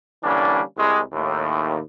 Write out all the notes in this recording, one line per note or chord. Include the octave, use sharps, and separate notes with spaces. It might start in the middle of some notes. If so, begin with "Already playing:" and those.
D3 E3 G3 A#3 C#4 D4
C2 G#3
D#2 A2